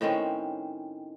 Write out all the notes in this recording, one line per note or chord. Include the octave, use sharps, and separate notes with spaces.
A2 D#3 C4 C#4